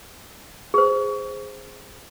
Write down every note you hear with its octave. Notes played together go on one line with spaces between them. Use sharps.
G#4 C5